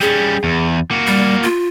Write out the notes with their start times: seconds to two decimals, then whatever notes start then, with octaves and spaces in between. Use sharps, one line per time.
0.01 G3 C#4 G#4
0.44 E2
0.91 A#3 F#4
1.07 G3
1.43 F4